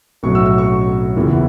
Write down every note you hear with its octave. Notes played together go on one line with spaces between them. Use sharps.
B1 A2 F#3 C#4 C#6
E6
E6
C#6
F#1 E2 E3 B3